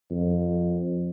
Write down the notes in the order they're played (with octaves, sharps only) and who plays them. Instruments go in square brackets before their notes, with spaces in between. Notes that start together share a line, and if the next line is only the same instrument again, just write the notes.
[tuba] F2